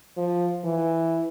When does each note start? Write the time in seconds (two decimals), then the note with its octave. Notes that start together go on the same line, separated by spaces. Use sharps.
0.17 F3
0.64 E3